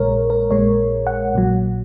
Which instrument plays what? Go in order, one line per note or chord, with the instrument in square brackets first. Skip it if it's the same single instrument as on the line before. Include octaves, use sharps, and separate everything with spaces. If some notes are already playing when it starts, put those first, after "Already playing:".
Already playing: [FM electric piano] A#1 A#2 G#3 A#4 C#5
A#4
A#1 A#2 G#3 C#5
F#5
A#1 A#2 F#3